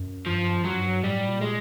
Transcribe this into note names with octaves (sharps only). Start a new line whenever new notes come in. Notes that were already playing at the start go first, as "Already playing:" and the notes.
Already playing: F#2
G2 F3
F#2
F#3
F#2
G2
A2 G3
A#2
G#3